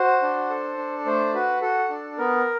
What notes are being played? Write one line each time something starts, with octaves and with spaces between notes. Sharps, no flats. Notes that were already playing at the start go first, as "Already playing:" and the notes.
Already playing: F#4 C5
D4
A4
D4
A3 C5
F#4 B4
F#4 A4
D4
B3 A#4